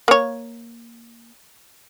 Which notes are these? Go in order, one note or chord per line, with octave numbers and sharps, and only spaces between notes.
A#3 C#5